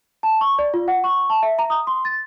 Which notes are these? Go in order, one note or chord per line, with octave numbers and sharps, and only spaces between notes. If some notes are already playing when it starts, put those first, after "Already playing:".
A5
C#6
D5
F4
F#5
C#6
A5
E5
A#5
D#6
C6
A6